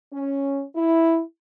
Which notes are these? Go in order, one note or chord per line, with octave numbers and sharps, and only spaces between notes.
C#4
E4